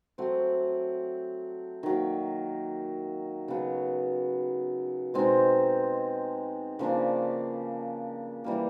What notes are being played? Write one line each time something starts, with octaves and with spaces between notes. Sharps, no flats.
F#3 A3 C4
D#3 F#3 A#3
C#3 F#3 B3
B2 G#3 C4 D#4
C#3 F3 A#3 D4
E3 G3 A#3